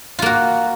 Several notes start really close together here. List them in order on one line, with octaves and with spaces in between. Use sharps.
F4 A#3 F#4